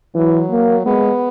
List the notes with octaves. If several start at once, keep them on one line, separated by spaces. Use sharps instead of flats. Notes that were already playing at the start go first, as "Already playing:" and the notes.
E3 F#3
A#3
G#3 B3